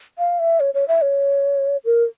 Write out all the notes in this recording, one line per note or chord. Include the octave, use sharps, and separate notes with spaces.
F5
E5
C#5
C#5
E5
C#5
A#4